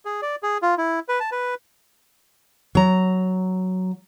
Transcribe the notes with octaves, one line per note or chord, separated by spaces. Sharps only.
G#4
D5
G#4
F4
E4
B4
A5
B4
F#3 A#5